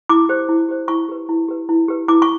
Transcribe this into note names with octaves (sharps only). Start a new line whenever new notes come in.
E4 D6
G4 C5
E4
G4 C5
E4 C#6
G4 B4
E4
G4 B4
E4
G4 B4
E4 D6
C#6